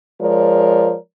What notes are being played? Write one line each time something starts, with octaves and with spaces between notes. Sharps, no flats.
F3 G#3 A#4 C#5 D5